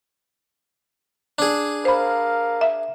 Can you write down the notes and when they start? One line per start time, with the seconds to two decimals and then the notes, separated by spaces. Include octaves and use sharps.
1.39 D4 G#4
1.85 A#4 C5 F5 B5
2.61 E5